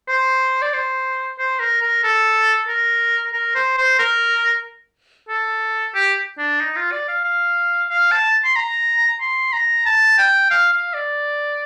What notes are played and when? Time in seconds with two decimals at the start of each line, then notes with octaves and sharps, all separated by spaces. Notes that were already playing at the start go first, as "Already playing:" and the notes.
0.08 C5
0.62 D5
0.73 C5
1.38 C5
1.60 A#4
1.82 A#4
2.03 A4
2.69 A#4
3.33 A#4
3.55 C5
3.77 C5
3.99 A#4
5.29 A4
5.95 G4
6.38 D4
6.60 D#4
6.76 F4
6.92 D5
7.08 F5
7.24 F5
7.90 F5
8.12 A5
8.44 C6
8.56 A#5
9.21 C6
9.53 A#5
9.86 A5
10.18 G5
10.51 F5
10.73 F5
10.94 D5